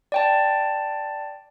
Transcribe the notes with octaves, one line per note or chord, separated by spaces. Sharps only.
D5 G5 A5